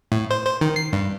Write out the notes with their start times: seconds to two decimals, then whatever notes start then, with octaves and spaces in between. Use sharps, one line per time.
0.12 A2
0.31 C5
0.46 C5
0.61 D#3
0.76 C7
0.93 G2